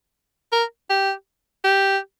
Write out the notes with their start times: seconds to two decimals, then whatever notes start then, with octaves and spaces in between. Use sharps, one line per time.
0.53 A#4
0.90 G4
1.64 G4